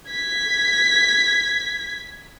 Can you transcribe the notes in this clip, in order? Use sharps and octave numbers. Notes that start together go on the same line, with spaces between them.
G#6 B6